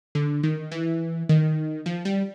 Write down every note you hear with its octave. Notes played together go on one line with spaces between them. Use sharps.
D3
D#3
E3
D#3
F3
G3